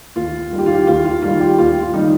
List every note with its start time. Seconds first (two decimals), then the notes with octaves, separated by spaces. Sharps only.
0.16 D#2 F4
0.52 D#3 G3
0.58 G4
0.66 F4
0.74 G4
0.87 D#2 F4
1.05 F4
1.22 D#3 G3 F4
1.41 G4
1.58 D#2 F4
1.82 F4
1.94 D#3 G3 D#4